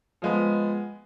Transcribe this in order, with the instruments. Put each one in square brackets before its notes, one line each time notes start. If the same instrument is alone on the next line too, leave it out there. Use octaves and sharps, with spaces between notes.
[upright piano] F3 G#3 B3